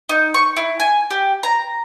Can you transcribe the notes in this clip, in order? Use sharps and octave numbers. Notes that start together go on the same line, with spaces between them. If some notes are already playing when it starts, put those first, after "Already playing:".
D#4
C#6
E4
G#5
G4
A#5